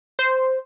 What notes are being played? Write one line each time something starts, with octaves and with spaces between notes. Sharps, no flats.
C5